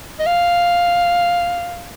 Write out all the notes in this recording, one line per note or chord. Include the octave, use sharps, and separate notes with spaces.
D#5
F5